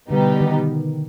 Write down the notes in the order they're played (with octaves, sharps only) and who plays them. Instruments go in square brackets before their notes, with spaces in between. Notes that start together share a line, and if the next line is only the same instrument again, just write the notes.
[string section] B2 G3 B3 D#4 G4 [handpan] D3
[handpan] D#3